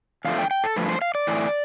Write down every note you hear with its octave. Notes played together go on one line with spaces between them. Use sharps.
E2 D3 F3 A3 F5
G5
G5
A4
G2 F3 A3 B4
C5
F5
D5
A2 E3 A3